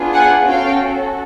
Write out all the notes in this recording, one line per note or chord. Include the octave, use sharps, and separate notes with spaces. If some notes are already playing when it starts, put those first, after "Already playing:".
Already playing: B3 D4 F4 G#4
F#5 G#5
C#4 F#4 A4 F5 G5